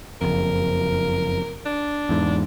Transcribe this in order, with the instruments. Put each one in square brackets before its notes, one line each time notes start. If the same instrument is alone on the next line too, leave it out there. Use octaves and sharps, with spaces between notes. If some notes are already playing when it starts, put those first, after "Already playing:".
[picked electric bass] F#1 F2 [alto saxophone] A#4
[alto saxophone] D4
[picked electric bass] E2 G#2